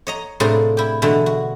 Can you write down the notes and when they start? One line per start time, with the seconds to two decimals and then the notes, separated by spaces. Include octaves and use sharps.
0.07 C#5 D#5 A#5
0.40 A2 C3 D4 F4 G#4 A#4
0.77 E4 G4
1.02 B2 D3 E3 G#3 A3
1.26 F#4